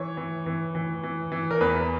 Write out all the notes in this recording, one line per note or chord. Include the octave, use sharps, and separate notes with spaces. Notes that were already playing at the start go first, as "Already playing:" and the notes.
Already playing: E3 C#5
E3
E3
E3
E3
E3
A#4
E2 B4